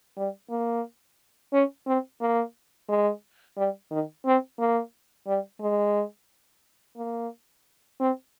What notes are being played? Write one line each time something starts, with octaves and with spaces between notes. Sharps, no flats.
G3
A#3
C#4
C4
A#3
G#3
G3
D#3
C4
A#3
G3
G#3
A#3
C4